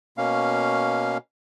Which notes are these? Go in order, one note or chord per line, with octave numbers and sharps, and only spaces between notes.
B2 A#3 C#4 F5